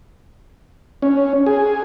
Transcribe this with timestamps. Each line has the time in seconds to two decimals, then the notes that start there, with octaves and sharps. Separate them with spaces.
1.02 C#4
1.46 G#4